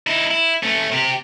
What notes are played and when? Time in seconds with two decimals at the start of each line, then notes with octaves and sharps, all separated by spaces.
0.07 D#4 E4
0.31 E4
0.63 A3 C#4
0.92 C3 G4